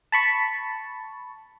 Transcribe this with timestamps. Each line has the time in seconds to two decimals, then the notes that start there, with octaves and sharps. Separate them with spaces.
0.12 A5 B5 C#6